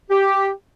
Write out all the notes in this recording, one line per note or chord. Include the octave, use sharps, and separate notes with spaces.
G4